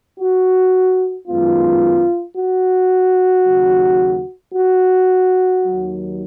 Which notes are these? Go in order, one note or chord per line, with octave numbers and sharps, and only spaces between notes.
F#4
F#2 D#3 G#3 B3 F4
F#4
D#2 C#3 F#3
F#4
D#2 D#3 F#3